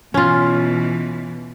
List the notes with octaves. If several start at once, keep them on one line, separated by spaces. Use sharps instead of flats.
B2 E3 C#4 F4